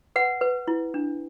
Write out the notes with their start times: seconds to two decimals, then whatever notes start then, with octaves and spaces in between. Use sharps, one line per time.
0.16 B4 F#5
0.41 B4
0.67 E4
0.94 D4